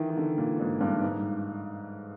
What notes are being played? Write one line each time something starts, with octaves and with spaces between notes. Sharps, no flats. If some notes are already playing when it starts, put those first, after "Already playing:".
Already playing: D#3 E3
D#3
D3
A#2
G#2
G2
G#2